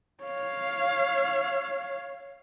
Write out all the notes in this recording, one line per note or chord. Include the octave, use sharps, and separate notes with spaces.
C#5 F5